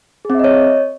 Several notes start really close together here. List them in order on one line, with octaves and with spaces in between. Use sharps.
G#4 C4 E5 D#5 C#5